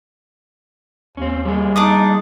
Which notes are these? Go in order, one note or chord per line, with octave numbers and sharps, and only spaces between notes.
D#2 C4 C#4
G3 A#3 G#4
D4 D#4 D6 D#6